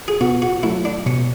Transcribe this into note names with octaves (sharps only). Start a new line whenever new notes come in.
G#4
B2 F#4
F#4
F#3 A3 E4
D4
B2 C#4